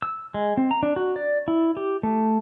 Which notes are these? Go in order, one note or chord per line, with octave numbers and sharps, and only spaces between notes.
E6
G#3
C4
A#5
D4
F#4
D5
E4
G4
A3